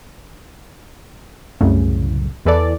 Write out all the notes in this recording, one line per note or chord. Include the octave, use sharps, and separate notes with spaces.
C2 F#2 A2 C#3
E2 E3 A4 D5